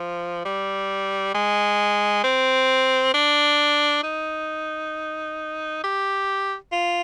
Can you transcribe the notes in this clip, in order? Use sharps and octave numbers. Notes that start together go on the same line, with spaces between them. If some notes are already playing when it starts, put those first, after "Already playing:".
Already playing: F3
G3
G#3
C4
D4
D#4
G4
F4